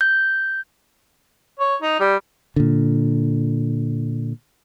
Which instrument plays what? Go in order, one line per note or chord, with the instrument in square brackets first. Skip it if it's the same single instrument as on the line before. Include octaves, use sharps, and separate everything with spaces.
[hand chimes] G6
[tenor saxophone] C#5
D#4
G3
[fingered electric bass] A#2 D3